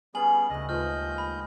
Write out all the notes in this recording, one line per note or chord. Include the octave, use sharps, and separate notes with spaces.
G3 B3 C#4 G#4 G#5 F#7
D2 A2 C#3 G3 D#5
D#2 G#2 F3 F4 B4 D#5 F6 G6
B5